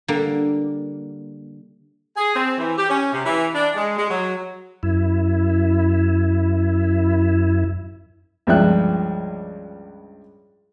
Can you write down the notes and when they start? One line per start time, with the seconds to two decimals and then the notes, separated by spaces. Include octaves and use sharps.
0.08 D3 G3 A#3
2.17 G#4
2.35 C4
2.58 E3
2.77 G4
2.90 C#4
3.12 C3
3.25 E3
3.55 D4
3.75 G#3
3.98 G#3
4.10 F#3
4.83 F#2 E4
8.47 C#2 G2 F3 E5 G5 F#6